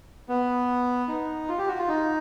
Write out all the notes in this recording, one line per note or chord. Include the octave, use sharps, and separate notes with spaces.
B3
D#4
F4
G4
F#4
F4
D#4